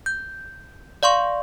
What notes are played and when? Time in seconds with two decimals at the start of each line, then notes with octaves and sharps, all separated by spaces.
0.06 G6
1.03 D5 F5 C6 C#6